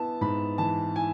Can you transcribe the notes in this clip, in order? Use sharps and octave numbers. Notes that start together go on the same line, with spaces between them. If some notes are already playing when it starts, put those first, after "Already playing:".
Already playing: B3 E4 A5
G#2 B5
E3 A5
E4 G#5